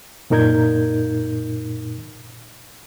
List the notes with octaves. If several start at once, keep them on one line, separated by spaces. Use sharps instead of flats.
F#2 A#2 D#4 A#4 G6 G#6